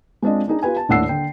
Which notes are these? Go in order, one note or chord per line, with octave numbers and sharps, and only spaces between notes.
G#3 C4 D4 F4 D#5
D4 D#4 G#4
F4 G4 B4 G#5
A5
D#1 A2 D4 F#5 E6 C7
D3 G5